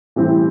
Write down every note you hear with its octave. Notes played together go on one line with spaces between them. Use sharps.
A2 E3 G3 C4 E4